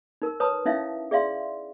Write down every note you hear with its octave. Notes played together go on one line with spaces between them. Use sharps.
D#4 A#4 E6
B4 C#5 A5 A#5 D#6
C#4 D#4 E4 E5 F5
G#4 D5 E5 F5 C6